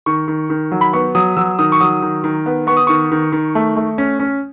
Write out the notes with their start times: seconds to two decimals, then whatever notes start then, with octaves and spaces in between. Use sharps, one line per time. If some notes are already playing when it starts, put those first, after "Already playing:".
0.06 D#3 C#6
0.28 D#3
0.50 D#3
0.72 F#3
0.81 B5
0.93 B3 C#6
1.15 F#3 D#6
1.37 F#3 E6
1.59 D#3 D#6
1.72 C#6
1.81 F#3 D#6
2.02 D#3
2.24 D#3
2.46 B3
2.67 B3 C#6
2.77 D#6
2.87 D#3 C#6
3.11 D#3
3.32 D#3
3.55 A3
3.77 A3
3.98 C#4
4.20 C#4